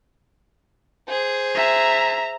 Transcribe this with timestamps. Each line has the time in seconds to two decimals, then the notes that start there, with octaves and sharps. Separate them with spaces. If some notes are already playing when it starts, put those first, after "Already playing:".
1.08 G#4 C5
1.55 E5 A#5